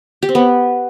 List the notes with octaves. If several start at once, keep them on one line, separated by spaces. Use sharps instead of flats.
G4
C4
B3